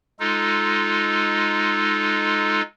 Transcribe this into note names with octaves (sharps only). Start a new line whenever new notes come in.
G#3 D#4 F4 A4